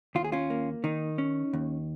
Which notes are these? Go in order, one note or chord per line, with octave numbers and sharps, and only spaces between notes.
D#2 F4
G#4
C#4 F4
A#3
D#3 D#4
C#4
D#2